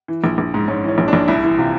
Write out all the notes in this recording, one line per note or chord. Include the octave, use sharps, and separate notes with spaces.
E3
A#1
A#1
G#2
G#2 C#4
E3 C#4
A#1
D4
A#1
C2 E4
E3
C3 F4